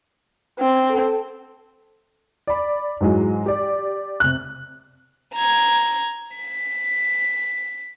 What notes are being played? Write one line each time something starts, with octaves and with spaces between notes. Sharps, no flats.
C4
A4
D5 B5
G#2 E3 F#3 G#3
G4 D5
C3 F#6
A#5 G#6
B6